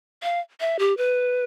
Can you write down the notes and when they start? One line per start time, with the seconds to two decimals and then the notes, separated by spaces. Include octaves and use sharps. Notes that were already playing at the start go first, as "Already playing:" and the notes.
0.23 F5
0.60 E5
0.79 G4
0.97 B4